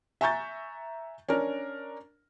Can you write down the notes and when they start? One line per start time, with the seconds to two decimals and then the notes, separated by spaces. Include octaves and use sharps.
0.21 E5 G#5 A#5 C#6 G6 A6
1.29 C#4 D4 A#4